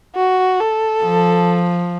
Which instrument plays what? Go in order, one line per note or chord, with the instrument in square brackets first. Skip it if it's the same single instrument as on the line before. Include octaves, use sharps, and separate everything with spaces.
[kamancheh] F#4
A4
[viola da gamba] F3